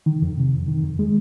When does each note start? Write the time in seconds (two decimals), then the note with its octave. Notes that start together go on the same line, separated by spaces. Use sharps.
0.06 D#3
0.22 F2
0.37 C3
0.53 F2
0.68 D#3
0.83 F2
0.99 G#3